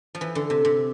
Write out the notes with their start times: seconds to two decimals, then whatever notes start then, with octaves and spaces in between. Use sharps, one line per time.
0.15 F3
0.21 E3
0.35 D3
0.50 C3
0.65 C3